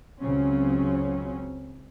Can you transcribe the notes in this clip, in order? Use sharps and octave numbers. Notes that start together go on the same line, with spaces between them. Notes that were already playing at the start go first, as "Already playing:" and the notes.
C#2 C#3 F#3 C4 C#4